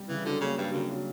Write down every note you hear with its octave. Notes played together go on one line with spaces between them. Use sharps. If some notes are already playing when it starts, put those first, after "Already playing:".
Already playing: G3
C#3 E3
D3 F#3
C#3 A#3
G2 D4
F#2 C#3
F#3